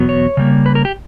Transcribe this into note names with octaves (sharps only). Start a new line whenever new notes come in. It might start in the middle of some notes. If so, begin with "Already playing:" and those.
Already playing: E2 B2 F#3 B3
C#5
C#3 G3 A#3
B4
A#4
G4